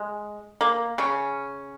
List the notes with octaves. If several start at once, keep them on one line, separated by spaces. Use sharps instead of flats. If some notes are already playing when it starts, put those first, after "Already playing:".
Already playing: G#3
A#3
C#3 C#4